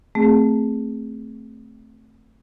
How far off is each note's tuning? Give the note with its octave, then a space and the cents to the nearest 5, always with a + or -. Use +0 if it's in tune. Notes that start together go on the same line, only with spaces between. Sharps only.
A3 +5 C4 +0 G#4 +0